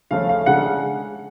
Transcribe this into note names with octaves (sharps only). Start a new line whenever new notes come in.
C#3 F3 A3 C#4 F5
F5
C#3 G#3 D4 F#5